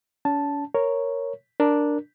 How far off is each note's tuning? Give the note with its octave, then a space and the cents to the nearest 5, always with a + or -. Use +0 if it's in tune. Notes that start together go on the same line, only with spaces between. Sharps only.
C#4 +40 A5 -5
A#4 +0 C#5 +0
D4 +0 A#4 +0